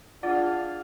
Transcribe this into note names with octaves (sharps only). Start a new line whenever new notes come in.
D4 F4 G#4 D5 F5 F#5 A6